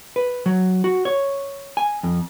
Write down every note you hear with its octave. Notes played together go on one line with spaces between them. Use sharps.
B4
F#3
F#4
C#5
G#5
F2